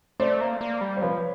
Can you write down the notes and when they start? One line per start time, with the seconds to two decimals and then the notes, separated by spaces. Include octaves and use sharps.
0.20 A3 C5 D5
0.41 A#3
0.61 A#3
0.81 G3
0.97 C5
1.02 F3 B4 C#5